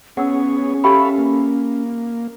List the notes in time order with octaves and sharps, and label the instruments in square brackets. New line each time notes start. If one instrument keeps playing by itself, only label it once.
[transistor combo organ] B3 G#4 C#5 [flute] C#4 [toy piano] F#5 E6
[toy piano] G4 G5 B5 [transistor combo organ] A4 E5 F5
[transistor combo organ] A#3